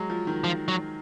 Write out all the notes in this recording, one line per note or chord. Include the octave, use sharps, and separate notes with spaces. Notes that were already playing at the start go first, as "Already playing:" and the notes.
Already playing: F#3 G#3
F3
D#3
F3
F#3